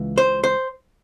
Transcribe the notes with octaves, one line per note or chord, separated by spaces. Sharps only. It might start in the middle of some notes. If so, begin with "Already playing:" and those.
Already playing: C#2 E3
C5
C5